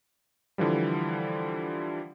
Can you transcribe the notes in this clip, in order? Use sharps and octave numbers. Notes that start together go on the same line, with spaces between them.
D3 E3 F3 G3